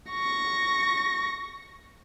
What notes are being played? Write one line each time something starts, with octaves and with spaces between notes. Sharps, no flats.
C#6 A#6